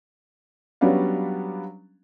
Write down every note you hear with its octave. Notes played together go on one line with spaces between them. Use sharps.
F#3 G3 B3 C#4 D4 F5